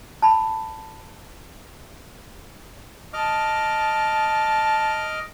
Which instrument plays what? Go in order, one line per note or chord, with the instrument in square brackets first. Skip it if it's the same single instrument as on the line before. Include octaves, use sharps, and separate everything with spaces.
[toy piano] A5 B5
[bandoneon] D#5 D6 F6 [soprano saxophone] A5